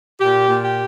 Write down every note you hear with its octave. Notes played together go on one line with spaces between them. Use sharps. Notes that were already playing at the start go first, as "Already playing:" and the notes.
A#2 G4
A#2
G4